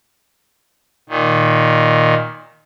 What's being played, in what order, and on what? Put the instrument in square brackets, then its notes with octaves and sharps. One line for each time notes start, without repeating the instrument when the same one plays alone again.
[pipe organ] A#2 D#3